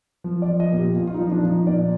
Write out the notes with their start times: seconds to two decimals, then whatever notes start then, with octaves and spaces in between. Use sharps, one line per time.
0.24 F3
0.42 D5
0.48 F3
0.60 D#5
0.72 A#2
0.78 G4
0.96 A#2 F4
1.07 F4
1.14 D#4
1.19 F3
1.32 D4
1.44 F3
1.49 D#4
1.67 A#2 D5